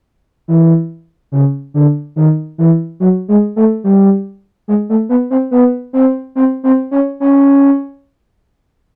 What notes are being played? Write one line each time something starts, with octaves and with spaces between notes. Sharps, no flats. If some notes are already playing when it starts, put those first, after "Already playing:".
E3
C#3
D3
D#3
E3
F#3
G#3
A3
G3
G#3
A3
B3
C4
B3
C4
C4
C4
C#4
C#4